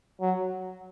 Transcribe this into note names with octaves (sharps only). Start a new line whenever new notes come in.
F#3